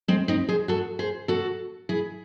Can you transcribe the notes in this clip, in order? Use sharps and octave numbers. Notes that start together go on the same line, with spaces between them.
G#3 C4
C4 D#4
G#4 C5
F#4 A4
G#4 C5
F#4 A4
E4 G#4